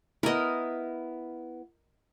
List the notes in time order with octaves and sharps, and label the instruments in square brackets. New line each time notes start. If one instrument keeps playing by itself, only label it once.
[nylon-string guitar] B3 E4 [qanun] A#4 D#5